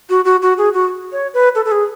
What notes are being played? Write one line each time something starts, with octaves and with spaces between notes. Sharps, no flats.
F#4
F#4
F#4
G#4
F#4
C#5
B4
A4
A4
G#4